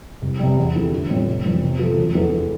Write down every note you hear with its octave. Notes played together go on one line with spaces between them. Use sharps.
C2
C3 G3
E2
D3 F3 A3 E4
A1
A2 G3 C4 F4
F1
F2 E3 G3 C4
C3
F3 A3
E1
E2 E3 A3